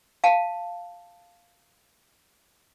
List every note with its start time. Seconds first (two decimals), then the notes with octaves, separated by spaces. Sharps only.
0.24 F5 A5